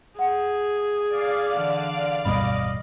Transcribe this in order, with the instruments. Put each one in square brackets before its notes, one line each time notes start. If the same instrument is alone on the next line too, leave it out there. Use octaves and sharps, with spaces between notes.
[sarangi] G#4 [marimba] F#5
[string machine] D5 F5
[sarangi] D3 [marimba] E3
[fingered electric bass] D1 G2 B2 [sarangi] D#5 [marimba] B5